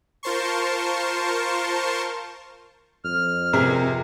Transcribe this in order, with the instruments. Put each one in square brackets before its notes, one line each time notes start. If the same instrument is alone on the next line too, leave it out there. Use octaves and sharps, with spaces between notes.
[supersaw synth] F4 A#4 C5 A5 C6 C#6
[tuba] F2 [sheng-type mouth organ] F6
[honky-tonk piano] C3 [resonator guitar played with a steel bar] G#4 A#4 B4